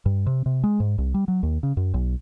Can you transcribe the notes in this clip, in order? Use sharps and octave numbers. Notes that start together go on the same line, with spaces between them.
G2
C3
C3
G#3
G#2
C2
G3
F#3
D#2
C#3
F#2
B1